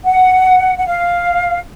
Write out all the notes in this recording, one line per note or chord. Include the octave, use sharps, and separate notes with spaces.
F#5
F#5
F5